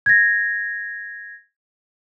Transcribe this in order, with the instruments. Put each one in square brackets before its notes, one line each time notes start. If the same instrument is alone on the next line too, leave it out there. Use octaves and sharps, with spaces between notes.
[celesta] G#6 A#6